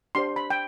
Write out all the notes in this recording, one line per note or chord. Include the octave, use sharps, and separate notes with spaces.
D4 G4 C5 C6
B5
G5